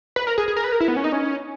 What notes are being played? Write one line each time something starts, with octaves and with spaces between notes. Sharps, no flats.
B4
A#4
G#4
G#4
A#4
B4
A#4
E4
B3
C#4
D#4
C#4